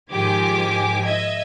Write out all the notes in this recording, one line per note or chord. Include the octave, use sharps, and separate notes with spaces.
G#2 D#3 F3 G4 G#5 D6
D#5 E5 G#6